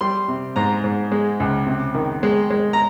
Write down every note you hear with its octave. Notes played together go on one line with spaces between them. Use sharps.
G3 C6
C3
G#2 A#5
G#2
G#3
C#2
C3
D#3
G#3
G#3
A#5